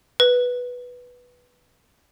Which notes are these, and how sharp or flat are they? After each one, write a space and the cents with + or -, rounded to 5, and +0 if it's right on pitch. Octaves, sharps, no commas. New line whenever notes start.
B4 -5